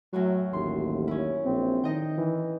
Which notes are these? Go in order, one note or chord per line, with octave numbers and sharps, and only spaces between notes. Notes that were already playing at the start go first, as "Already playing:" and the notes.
F#2 A2 F#3 F#4
A1 D#2 C6
C#4 E4
A#1 C4
D#3 D#4 D#5 G5
E3